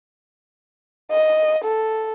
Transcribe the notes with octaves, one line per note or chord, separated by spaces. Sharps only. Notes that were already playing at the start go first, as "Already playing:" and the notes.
D#5
A4